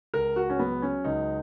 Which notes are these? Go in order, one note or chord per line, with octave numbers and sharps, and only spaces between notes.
C#2 A#4
F#4
C#4
F#3 B3
C#4
C#2 D#4